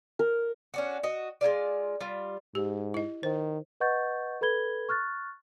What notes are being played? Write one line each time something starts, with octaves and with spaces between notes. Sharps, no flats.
A#4
C#4 D4 F#4
F#4 D#5
G#3 E4 F4 D5
G3 F4
G#2 G4
E4 D#5
D#3 C5
B4 D#5 F#5 C#6 G6 A6
A4 B4 B5 G#6 G7
C#6 F6 F#6 A6